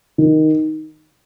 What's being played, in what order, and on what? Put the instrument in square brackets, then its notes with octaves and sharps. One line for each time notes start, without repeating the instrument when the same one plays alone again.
[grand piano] D#3